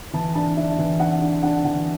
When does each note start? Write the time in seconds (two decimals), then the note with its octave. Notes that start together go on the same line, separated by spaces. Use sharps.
0.13 E3 A5
0.35 D4 A5
0.57 D4 E5
0.79 E3
1.00 D4 F#5
1.22 D4
1.43 D4 F#5
1.65 E3 F#5